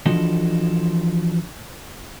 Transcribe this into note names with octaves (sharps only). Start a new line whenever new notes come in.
E3 F3 D4 F#4 A4 D#5